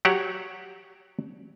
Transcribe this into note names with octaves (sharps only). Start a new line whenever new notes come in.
F#3 G4 C#5 E5 F#5